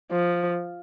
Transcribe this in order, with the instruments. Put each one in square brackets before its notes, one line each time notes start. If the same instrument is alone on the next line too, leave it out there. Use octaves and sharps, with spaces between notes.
[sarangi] F3